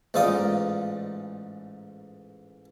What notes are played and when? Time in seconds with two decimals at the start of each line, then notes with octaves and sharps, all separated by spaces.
0.14 A1 G#2 D#4 F4 D5 D#6